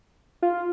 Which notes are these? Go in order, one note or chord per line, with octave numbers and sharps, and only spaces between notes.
F4